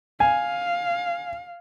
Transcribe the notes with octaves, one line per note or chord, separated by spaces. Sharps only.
F5 G#5